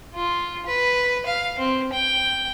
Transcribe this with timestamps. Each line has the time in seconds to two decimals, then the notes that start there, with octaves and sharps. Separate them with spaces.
0.15 F4
0.66 B4
1.26 F5
1.59 C4
1.93 G5